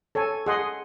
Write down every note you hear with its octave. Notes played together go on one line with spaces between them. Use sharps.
A4 C#5 G#5
G#4 D#5 F#5 C6